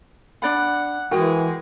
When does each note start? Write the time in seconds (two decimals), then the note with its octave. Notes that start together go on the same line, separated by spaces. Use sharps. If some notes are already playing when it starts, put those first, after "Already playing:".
0.42 D4 D5 F#5 B5
1.11 E3 G#3 F#4 A#4 G5